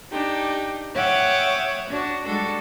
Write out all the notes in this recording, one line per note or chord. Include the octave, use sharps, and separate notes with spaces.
D4 D#4 G4
C#5 E5 F#5 G5 D6 D#6
D4 F#4
G3 G#3 D4 F#4 A4